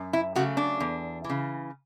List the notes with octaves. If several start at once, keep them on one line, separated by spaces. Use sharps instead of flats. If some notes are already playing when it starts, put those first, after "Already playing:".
Already playing: F#2
E4
C#3 F#3 A3 F#4
D4
E2
E3
C#3